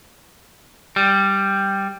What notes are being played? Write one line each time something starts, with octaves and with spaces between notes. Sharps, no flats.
G3